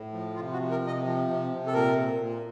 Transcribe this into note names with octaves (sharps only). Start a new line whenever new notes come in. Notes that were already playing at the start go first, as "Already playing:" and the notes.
Already playing: A2
F3
C3 F4
F#4
F3
A#4
C3
D#5
F3
C3
C3
A4
A#2 A#4
A#2
A#2